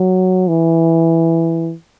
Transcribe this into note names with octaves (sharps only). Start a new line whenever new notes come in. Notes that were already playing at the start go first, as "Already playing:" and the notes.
Already playing: F#3
E3